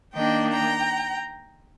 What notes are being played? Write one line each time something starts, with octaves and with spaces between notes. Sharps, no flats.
D#3 A#3 D4 D#5 G5
G5 A#5